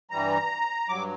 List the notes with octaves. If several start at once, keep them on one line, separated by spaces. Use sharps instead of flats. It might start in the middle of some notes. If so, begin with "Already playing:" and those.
G2 E3 G3 A#5
G2 F#3 D6